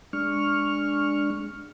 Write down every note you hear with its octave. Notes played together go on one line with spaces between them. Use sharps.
G#3 D4 C#6 F6